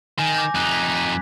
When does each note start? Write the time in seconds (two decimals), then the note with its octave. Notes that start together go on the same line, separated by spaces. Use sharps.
0.19 D#3 G#5
0.35 D6 G6 A#6
0.55 F2 D#4 F#6
0.71 G#6 B6
0.95 B6